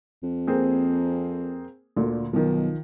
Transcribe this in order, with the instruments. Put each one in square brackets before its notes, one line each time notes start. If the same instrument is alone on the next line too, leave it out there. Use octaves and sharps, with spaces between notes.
[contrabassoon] F2
[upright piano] A#3 C4 G#4
D2 A#2 D3
[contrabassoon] B1 [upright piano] D#3 F3